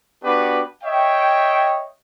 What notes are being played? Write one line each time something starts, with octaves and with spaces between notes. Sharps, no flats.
B3 D4 F#4 G4 B4
C#5 D#5 E5 G5